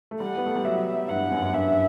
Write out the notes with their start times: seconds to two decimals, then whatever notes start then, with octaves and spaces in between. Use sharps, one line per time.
0.11 A3
0.20 G3 F#5
0.37 B3
0.46 A3
0.56 G3
0.64 F#3 E5
1.09 G2 F#5
1.31 F#2
1.42 F#2
1.53 G2 E5